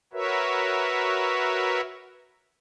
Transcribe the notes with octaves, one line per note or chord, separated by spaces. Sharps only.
F#4 A#4 B4 C#5 E5